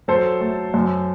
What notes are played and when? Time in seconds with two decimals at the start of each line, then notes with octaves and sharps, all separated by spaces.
0.08 F#3 A4 C5
0.41 A3
0.74 F#2